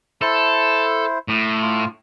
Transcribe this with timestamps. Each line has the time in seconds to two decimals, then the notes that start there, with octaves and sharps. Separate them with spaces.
0.22 E4 A4 C5
1.28 A2
1.62 F4